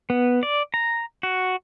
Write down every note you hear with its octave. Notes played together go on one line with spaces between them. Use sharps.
B3
D5
A#5
F#4